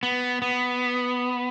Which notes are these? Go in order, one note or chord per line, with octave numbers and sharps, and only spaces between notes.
B3
B3